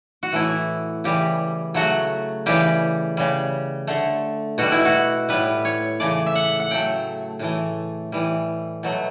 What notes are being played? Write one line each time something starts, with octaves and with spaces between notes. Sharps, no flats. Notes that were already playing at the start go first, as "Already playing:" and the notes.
F#4
A2 E3 A3 E4
C#3 E3 G3 G4
C#3 F#3 A3 F#4
C#3 E3 G3 G4
C#3 G3
D3 A3
B2 G3 F#4
E4
F#4
A2 G3 B4
C#5
C#3 E3 A3 D5
E5
F#5
F#5
C#3 F#3 A3 G5
A2 E3 A3
A2 E3 G3
B2 F#3 A3